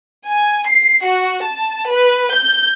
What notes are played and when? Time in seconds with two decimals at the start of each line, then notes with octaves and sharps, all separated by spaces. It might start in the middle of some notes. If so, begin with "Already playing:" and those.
0.29 G#5
0.69 C7
1.05 F#4
1.44 A5
1.92 B4
2.35 G6